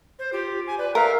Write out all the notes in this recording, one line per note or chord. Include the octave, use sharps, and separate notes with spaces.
C5
F4 G4
G#5
B4 D5
A#4 E5 F5